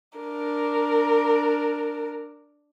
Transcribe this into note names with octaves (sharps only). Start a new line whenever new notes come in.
D4 A#4